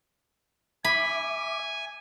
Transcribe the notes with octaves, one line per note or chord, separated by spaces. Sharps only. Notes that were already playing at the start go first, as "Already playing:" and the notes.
E5 G#5 B5 D6